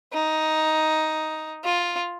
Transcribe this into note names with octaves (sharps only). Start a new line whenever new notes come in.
D#4
F4